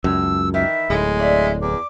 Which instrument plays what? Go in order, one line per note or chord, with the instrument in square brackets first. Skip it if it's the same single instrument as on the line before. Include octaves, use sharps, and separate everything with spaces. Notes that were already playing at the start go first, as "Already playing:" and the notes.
[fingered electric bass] C#2 F#2 [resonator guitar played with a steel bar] A2 [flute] E6
[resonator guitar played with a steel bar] D#3 E3 E4 [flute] E5
[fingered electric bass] D1 A2 [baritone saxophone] G#3
[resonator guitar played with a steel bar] D5 [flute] E5
[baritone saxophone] E2 [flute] D6